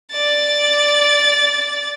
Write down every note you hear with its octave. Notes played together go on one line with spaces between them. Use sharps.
D5 A6